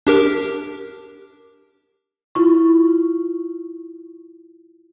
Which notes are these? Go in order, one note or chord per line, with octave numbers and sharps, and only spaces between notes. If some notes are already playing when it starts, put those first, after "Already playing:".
D4 G4 A#4
E4 F4 C#6